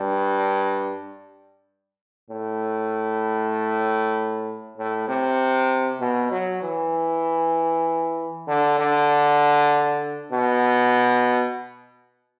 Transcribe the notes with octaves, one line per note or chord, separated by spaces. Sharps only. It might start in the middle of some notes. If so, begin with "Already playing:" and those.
Already playing: G2
A2
A2
C3
B2
F#3
E3
D3
D3
B2